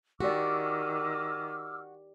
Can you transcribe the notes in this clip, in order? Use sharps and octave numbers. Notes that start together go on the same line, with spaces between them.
D#3 F#4 G4 D5 D6 E6 F6